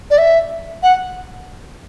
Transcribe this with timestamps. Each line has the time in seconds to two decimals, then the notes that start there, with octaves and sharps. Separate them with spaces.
0.10 D5
0.18 E5
0.83 F#5